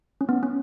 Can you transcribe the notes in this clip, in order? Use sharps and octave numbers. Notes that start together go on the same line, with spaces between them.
C#4
B3
C#4